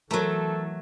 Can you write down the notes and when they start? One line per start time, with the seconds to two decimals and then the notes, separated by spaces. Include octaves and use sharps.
0.11 E3 F#3 A3 F#4 A4 A#4 A#5